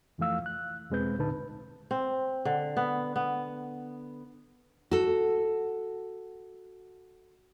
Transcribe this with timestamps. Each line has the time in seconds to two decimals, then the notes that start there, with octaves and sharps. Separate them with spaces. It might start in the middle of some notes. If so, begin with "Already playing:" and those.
0.18 F2 E3 F3 A3 F5 E6
0.46 F#6
0.90 E2 B2 G#3 C4 B4 G6
1.18 C2 A2 D3 D#4 B4 A5
1.32 B4
1.91 C4
2.45 D3
2.77 B3
3.16 B3
4.91 F#4 A4